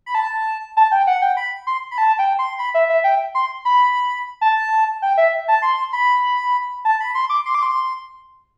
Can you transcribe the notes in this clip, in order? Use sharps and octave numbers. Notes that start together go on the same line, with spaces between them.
B5
A5
A5
G5
F#5
G5
B5
C6
B5
A5
G5
C6
B5
E5
E5
G5
C6
B5
A5
G5
E5
A5
C6
B5
A5
B5
C6
D6
C6
D6
C6